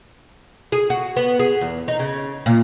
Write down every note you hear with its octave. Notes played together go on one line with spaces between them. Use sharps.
G#4
F#4
B3
G#4
E2
D#4
C#3
A#2